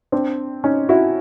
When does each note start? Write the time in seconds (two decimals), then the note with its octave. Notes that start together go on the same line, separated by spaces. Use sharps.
0.12 C4 D4
0.64 C#4 D#4
0.89 E4 F#4